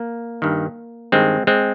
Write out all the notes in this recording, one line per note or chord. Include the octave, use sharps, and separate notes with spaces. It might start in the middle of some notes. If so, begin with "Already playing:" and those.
Already playing: A#3
G2 D#3
G2 D#3 G#3 C4
G#3 C4